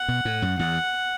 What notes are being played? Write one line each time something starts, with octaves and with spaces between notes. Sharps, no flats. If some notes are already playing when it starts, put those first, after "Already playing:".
Already playing: F#5
B2
A2
F#2
E2 F#5